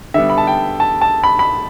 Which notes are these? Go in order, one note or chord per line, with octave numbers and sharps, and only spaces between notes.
D3 G3 B3 E5
B5
A5
G5
A5
A5
B5
B5